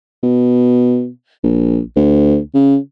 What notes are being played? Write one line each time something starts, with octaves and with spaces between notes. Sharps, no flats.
B2
A#1
D2
C#3